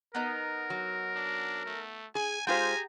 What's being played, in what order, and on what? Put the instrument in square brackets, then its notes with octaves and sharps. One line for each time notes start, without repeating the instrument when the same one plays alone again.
[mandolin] B3 D#4 [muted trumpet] A#4
[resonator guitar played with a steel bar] F#3
[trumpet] D4
A3
[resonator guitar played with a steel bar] G#4 [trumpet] G#5
[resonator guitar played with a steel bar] G#3 F4 C5 [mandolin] G4 G#4 G5 [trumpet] G#5 [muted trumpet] A#5